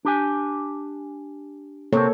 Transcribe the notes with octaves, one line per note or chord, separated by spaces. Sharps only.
D4 G4 G#5
C3 A#3 C4 A4 C#5